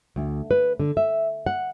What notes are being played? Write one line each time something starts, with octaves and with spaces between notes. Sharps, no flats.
D2
B4
D3
E5
F#5